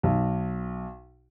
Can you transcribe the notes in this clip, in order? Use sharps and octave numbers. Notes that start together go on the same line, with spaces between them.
B1